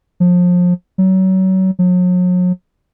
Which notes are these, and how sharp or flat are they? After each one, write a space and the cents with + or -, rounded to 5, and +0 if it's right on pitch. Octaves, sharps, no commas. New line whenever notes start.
F3 +30
F#3 +30
F#3 -40